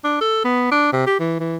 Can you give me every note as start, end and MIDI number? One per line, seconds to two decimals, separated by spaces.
0.04 0.20 62
0.21 0.42 69
0.45 0.69 59
0.71 0.89 62
0.93 1.05 48
1.07 1.17 67
1.19 1.37 52
1.40 1.57 52